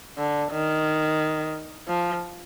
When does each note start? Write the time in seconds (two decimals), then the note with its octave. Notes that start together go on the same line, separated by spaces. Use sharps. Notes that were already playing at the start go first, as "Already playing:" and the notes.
0.18 D3
0.52 D#3
1.88 F3